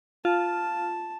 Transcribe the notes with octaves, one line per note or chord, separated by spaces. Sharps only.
F4 A5